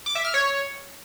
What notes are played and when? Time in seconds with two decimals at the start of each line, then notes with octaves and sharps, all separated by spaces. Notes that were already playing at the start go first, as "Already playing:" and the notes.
0.06 D6
0.15 E5
0.25 F6
0.34 C#5